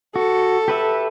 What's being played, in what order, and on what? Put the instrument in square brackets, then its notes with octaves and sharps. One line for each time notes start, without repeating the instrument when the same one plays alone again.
[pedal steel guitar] F#4 [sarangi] A4
[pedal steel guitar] G4 B4 E5